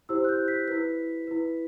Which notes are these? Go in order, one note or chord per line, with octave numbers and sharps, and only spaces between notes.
E4 G4 C5 E6
F#6
G6
B6
E4 B4 B6
E4 B4